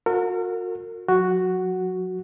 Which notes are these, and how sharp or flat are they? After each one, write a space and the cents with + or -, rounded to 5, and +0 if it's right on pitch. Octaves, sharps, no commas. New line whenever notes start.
F#4 -40 A#4 -40
F#3 -35 F#4 +0